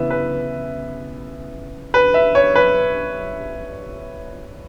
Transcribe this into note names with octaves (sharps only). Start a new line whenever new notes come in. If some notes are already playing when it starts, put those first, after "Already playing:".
Already playing: C#3 E3 B3 E4 B4 E5
B4
B4
E5
C#5
B4